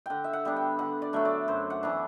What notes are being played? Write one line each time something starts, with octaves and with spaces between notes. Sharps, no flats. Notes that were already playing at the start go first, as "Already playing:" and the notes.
D3 F#5 G5
E5
F#5
G3 B3 D4
G5
D3 F#5
D5
F#3 A3 D4 E5
D5
F#2 C5
F#5
E3 B3 D4